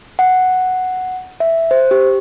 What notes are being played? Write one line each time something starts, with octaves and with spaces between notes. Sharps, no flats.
F#5
E5
C5
G4